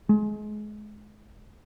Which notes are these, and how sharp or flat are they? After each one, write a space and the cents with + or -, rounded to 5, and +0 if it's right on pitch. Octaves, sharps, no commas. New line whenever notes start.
G#3 +30